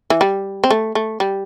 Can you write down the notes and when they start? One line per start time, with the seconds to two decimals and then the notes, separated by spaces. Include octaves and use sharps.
0.10 E3
0.21 G3
0.64 C4
0.70 A3
0.95 A3
1.20 G3